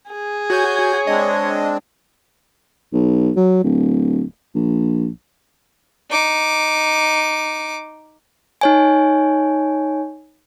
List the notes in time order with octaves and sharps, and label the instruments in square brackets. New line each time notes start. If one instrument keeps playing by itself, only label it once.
[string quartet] G#4
[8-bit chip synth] F#4 G#5 G6 [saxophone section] C#5
[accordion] G#3 C4 D4 [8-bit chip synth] D#5
[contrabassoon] B1
F#3
D1
A#1
[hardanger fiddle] D#4 D6
[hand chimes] D#4 C#5 G#5